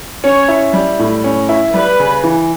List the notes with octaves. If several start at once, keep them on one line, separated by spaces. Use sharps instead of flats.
C#4 C#5
E4
G3
A2
C#4
E4
G3 B4
C#3
E3